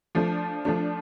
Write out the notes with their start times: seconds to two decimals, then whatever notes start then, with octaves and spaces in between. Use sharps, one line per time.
0.15 F3 A3 D4
0.65 F3 A3 D4